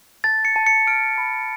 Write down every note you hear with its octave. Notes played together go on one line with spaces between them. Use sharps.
A5 A6
C#7
A5
C#7
F6 D7
B5